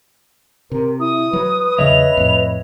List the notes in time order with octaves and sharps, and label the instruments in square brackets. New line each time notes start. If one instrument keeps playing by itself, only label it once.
[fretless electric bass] C3 [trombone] A#4
[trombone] E4 [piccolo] D#6
[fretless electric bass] F#3 [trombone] B4
[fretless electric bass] E2 C#3 F#3 [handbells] C#5 D#5 E5 [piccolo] F7
[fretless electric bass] F2 A2